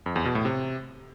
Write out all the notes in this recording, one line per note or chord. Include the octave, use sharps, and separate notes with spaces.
F2
E2
B2
A2
C3